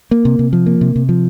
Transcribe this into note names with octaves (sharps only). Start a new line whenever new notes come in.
A#3
C3
C3
F3
A#3
C3
C3
F3